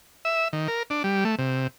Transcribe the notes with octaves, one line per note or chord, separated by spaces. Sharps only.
E5
D#3
A#4
D4
G3
A3
C3